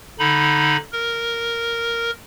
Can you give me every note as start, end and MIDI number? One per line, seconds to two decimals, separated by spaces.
0.19 0.77 50
0.19 0.77 63
0.19 0.77 83
0.92 2.11 70